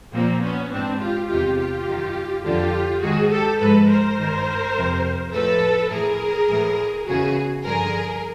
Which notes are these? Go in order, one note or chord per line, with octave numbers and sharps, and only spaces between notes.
A#2 F3 A#3 C4
B3 C#4
G#2 E3 C4 D4
F4 G4
E2 C3 D#3 F4 G4
F4 G4
F#2 D#3
F2 D3 F3 F4 G4
G#2 D#3 F#4 G#4
G4 A4
G#2 F3 A4 B4
A#4 C5
G2 D#3
F2 C3 F3
A2 F3 A4 B4
A2 E3 G#4 A#4
A2 E3
E2 C#3 E3 F#4 G#4
G2 D3 F3 G#4 A#4